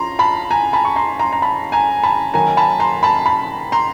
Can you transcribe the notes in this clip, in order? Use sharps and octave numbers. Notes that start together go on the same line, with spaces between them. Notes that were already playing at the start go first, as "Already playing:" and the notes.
Already playing: F3 C#4 A#5 C6
A5 B5
G#5 A#5
A5 B5
C#6
A#5 C6
A#5 C6
A#5
A5 B5
G#5 A#5
A5 B5
D#3 F#3 A#3 G#5 A#5
A5 B5
A#5 C6
A5 B5
A5 B5
A#5 C6